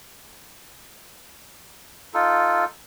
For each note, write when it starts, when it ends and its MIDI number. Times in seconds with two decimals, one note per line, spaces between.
2.14 2.65 63
2.14 2.65 65
2.14 2.65 69